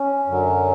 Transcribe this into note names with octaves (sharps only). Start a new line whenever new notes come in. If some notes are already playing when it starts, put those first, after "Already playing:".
Already playing: C#4
F#2 D3 F#3